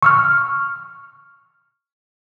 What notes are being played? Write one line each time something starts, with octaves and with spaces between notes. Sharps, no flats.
C#6 E6 F6